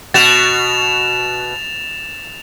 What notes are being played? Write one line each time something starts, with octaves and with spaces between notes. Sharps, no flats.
B2 F#4 A6 E7 F7